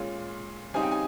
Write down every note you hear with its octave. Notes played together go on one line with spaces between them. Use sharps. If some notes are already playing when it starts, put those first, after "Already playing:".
Already playing: A#2 G#3 C#4 F4
C#3 G3 C4 D#4 G#5
G5
G#5